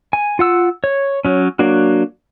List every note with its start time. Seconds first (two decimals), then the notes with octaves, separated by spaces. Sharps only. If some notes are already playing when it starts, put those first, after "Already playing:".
0.13 G#5
0.39 F4 F#5 E6
0.84 C#5
1.25 F#3 C#4
1.59 F#3 A#3 D4 F#4